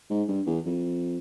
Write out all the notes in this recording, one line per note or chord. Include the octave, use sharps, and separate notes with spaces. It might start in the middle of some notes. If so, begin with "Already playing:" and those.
G#2
G2
E2
F2